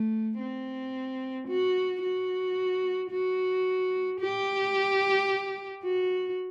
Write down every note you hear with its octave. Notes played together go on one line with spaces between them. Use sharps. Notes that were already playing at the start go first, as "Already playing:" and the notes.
Already playing: A3
C4
F#4
F#4
F#4
G4
F#4